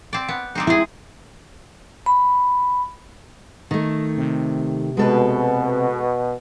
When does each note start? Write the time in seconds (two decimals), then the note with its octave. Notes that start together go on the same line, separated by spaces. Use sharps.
0.13 C4 D5
0.28 B3
0.55 G3 C4 D#4
0.67 G#3 E4 G#4
2.06 B5
3.71 D#3 A3
4.17 C3
4.97 B2 G#3 A4 B4